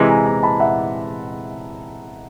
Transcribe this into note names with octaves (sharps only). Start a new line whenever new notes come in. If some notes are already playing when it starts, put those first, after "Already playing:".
Already playing: C3 E3 G#3 C6 D6
G#5 A#5
G#5 A#5
A5 B5
E5 F#5